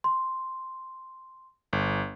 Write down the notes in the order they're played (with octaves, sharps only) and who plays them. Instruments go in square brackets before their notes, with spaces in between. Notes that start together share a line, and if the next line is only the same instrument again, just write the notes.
[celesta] C6
[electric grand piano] G1